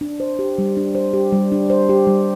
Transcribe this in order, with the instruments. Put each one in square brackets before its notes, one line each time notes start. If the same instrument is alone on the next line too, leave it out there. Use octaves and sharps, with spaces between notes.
[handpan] D4
C5
G4
G3
D4
C5
G4
G3
D4
C5
G4
G3